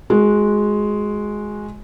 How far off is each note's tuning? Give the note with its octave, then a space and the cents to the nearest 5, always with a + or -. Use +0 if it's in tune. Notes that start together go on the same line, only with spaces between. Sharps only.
G#3 +5 F#4 -15